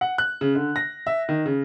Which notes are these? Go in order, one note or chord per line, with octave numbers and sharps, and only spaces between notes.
F#5
F#6
C#3
D3
A#6
E5
D#3
C#3